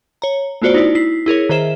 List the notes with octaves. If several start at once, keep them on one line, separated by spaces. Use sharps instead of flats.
C#5 A#5
A3 B3 F4 F#4 C5 D5
D#4 E4 D5
E4 B6 C7
E4 G#4 A#4 C#5
D#3 G#4 C5 E5 E7